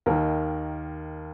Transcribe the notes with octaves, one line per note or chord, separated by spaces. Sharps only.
D#2 D#3 A#4